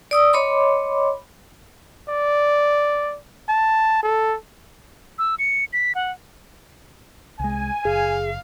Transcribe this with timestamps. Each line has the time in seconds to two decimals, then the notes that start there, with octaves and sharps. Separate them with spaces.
0.11 D5 D#6 E6
0.33 C#5 D#5 B5 C6 D6
2.09 D5
3.49 A5
4.03 A4
5.19 E6
5.39 C#7
5.73 B6
5.95 F#5
7.40 C2 G#3 G#5
7.85 F#1 G#4 F5